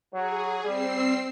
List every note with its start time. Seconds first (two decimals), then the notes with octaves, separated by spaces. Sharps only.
0.13 F#3 G#4
0.65 G3 C4 E6 C7